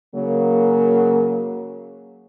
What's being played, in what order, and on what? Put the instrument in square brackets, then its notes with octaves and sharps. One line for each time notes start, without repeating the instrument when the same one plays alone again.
[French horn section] C#3 F#3 A#3